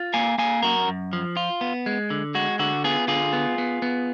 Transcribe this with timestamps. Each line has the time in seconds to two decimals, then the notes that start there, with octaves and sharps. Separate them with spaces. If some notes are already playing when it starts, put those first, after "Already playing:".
Already playing: F4
0.14 A#3 F5 G#5
0.38 A#3 F5 G#5
0.63 F#2 F#4 A#4
0.88 F#2
1.13 F3
1.37 F4
1.61 B3
1.86 G#3
2.10 D3
2.35 G#3 F#4
2.59 D3 F#4
2.84 B3 F4 G#4
3.08 D3 F4 G#4
3.33 B3
3.58 B3
3.82 B3